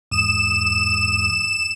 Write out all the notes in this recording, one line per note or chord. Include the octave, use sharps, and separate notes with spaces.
E2 G#2 D#6 E7